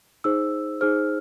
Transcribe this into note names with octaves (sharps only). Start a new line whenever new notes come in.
D#4 G#4 C5 E6
D#4 G#4 C5 F6